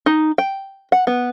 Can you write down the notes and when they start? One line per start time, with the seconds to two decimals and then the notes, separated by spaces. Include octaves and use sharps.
0.06 D#4
0.38 G5
0.92 F#5
1.07 B3